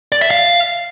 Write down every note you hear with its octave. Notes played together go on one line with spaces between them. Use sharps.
D5
E5
F5